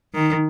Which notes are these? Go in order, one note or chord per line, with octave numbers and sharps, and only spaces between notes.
D#3